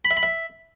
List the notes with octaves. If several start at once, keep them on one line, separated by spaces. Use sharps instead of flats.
B5
E5
B5
E5